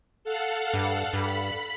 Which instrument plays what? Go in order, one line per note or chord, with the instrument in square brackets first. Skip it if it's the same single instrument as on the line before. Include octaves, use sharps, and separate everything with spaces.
[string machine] A4 F5 F#5
[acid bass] G2
[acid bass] G2 [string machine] B5